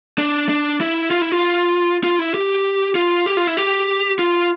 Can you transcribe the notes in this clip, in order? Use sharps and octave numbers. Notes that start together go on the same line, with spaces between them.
D4
D4
E4
F4
E4
F4
F4
E4
G4
F4
G4
F4
E4
G4
F4